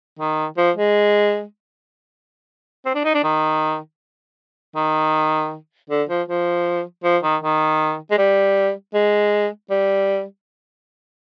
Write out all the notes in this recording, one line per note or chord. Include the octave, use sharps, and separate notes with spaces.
D#3
F3
G#3
C4
D4
D#4
D4
D#3
D#3
D3
F3
F3
F3
D#3
D#3
G#3
G3
G#3
G3